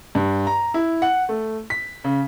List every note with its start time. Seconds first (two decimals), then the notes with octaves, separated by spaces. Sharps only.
0.15 G2
0.47 A#5
0.74 E4
1.02 F#5
1.29 A3
1.70 B6
2.04 C#3